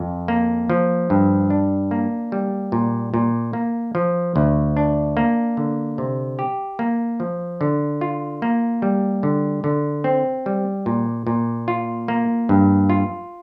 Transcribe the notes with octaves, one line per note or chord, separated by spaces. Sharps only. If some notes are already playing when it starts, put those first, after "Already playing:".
Already playing: F2
A#3
F3
G2
D4
A#3
G3
A#2
A#2
A#3
F3
D2
D4
A#3
D3
C3
G4
A#3
F3
D3
F4
A#3
G3
D3
D3
C4
G3
A#2
A#2
F4
A#3
G2
F4